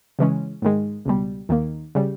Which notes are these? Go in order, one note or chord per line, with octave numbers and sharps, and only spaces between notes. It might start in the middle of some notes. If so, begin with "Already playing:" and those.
C#3 E3 G#3 C#4
G#2 D#3 G#3
C#2 B2 G3
D#2 D#3 A#3
C#3 G3